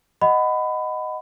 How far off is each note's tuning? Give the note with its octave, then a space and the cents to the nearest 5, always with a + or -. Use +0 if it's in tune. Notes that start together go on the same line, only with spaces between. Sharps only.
D#5 +0 F#5 +0 B5 +20